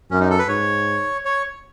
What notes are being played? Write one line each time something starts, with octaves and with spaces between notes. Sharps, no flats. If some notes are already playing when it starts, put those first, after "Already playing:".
F#2 C#4
D#4
A4
B4
G#2 C#5
C#5